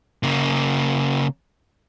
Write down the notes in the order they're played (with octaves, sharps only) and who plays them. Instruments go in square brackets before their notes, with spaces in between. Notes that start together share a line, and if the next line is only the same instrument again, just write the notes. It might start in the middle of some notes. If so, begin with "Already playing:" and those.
[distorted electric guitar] C#3 A#3